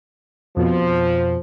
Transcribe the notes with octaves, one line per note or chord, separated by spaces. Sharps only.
F2 B2 F3